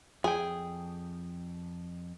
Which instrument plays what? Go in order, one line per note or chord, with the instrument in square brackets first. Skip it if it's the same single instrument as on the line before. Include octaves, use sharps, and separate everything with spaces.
[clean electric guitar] F2 G5 [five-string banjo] G#4